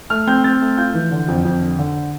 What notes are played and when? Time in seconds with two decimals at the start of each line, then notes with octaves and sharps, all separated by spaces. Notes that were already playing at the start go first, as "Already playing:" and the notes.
0.10 A3 F6
0.27 C4 G6
0.44 C4 A6
0.61 A3
0.77 F4 G6
0.94 E3
1.11 D3
1.28 F2
1.45 F2
1.61 D3
1.79 D3